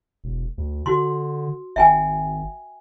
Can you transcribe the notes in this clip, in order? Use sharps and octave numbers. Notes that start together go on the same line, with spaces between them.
E1
D2
D3 F#4 C6
G#1 E5 G5 G#5